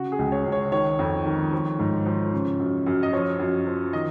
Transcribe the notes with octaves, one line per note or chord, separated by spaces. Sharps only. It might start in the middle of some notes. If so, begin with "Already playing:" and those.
Already playing: C#3 F#4
G#4
C#2
C#5
C#2
C#5
D#3 C#5
F2
D#3
F3
G#2
F3
C#3
F#2
F#2
D#5
F3 C#5
F#2
F3
D#3 D#5